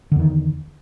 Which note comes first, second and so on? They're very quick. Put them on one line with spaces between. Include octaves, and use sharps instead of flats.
D3 E2 D#3